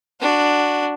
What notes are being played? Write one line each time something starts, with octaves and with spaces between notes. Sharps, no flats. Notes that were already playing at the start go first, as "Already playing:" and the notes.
D4 F#4